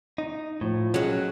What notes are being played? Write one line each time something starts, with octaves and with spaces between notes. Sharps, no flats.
D#4
A2 F3
F#3 G#3 C#4